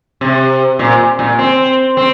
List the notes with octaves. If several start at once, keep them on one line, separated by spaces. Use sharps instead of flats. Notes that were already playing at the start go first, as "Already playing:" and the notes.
C3
A#2
A#2
C4
C4